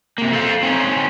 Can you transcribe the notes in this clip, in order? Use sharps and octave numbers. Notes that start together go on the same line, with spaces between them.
C3 A#3
A4 C5 F5
C4 C#4 D#4